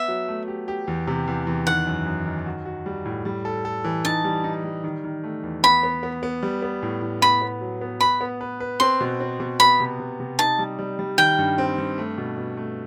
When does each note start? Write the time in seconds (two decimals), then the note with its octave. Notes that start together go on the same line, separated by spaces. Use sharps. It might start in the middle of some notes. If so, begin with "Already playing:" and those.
Already playing: B3 E5
0.08 F#3
0.28 A3
0.48 G4
0.68 G4
0.87 E2
1.07 C3
1.27 E2
1.47 E2
1.67 D#3 F#5
1.87 F#2
2.06 F#2
2.26 D#3
2.46 F#4
2.65 F#4
2.86 G3
3.05 A2
3.25 G3
3.45 A4
3.65 A4
3.84 E3
4.05 D#4 A5
4.24 G3
4.44 D#4
4.64 G3
4.84 D#3
5.04 D#3
5.24 A3
5.43 E2
5.64 B3 B5
5.83 B3
6.03 B3
6.23 B3
6.43 G3
6.62 B3
6.83 A2
7.02 A2
7.22 B3 B5
7.42 B3
7.61 F#3
7.81 B3
8.01 B4 B5
8.21 B3
8.41 B4
8.60 B4
8.80 C4 C6
9.00 B2
9.20 C4
9.40 B2
9.60 B3 B5
9.80 C3
10.00 C3
10.20 C3
10.39 D#4 A5
10.59 G3
10.79 G3
10.99 G3
11.18 D#3 G5
11.38 G2
11.58 C4
11.78 G2
11.98 A3
12.18 B2
12.37 B2
12.57 A3